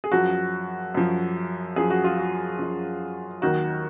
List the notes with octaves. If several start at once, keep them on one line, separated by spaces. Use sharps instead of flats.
G#4
F#2 F3 F#4
F#2 F3
F#2 F3 G#4
F#4
F4
F#4
F#2 F3
D#2 D#3 F#3 F#4